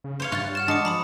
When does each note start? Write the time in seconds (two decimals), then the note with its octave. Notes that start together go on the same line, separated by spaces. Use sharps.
0.04 C#3
0.20 C5 C#5 F5
0.32 G2 F4 C#6 F#6 A6
0.55 F#5 F6 A6 E7
0.68 G#3 D4 A5 C#6 D6 C#7
0.85 F3 A#5 B5 D#6